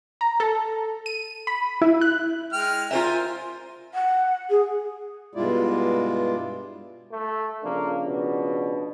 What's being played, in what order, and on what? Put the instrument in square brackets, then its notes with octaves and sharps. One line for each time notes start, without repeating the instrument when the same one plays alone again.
[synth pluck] A#5
A4
D#7
B5
E4
F#6
[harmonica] G#3 G5 F6
[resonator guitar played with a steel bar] F4 C5 E5 [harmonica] A#4 G#5
[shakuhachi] F#5
G#4
[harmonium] G2 B2 G#3 E4 F4 D5
[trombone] A3
[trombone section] C#3 F3 D4 [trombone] A#3
[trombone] B2